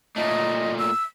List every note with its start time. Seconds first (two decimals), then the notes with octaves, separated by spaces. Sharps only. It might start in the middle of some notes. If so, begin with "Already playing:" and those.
0.16 A#2 A3 D#5
0.79 E6